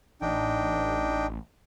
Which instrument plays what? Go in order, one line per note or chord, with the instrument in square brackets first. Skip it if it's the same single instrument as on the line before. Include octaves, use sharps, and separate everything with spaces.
[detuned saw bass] A1 [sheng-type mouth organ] D4 D#4 G5